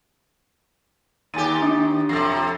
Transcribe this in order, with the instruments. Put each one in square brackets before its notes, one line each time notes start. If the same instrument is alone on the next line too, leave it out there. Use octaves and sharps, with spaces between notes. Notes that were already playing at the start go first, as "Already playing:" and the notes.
[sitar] D#2 G4 [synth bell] G#5 A6 D#7
[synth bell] D4
[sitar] F2 C3 [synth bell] E6 A#6 C7